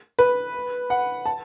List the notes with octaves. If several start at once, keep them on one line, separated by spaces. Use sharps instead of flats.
B4
F#5
A5